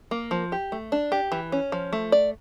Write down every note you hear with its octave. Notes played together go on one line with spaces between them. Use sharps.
A#3
F3
G4
A3
D4
G4
E3
C#4
F3
A3
D5